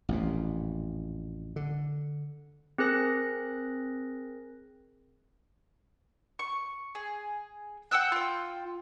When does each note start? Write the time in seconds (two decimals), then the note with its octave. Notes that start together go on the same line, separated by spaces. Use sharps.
0.09 A1 F2 A#2
1.56 D3
2.78 C4 G#4 A#4 F#6 A#6
6.39 C#6
6.95 G#4
7.91 F#5 G5 E6 F#6
8.12 F4 G5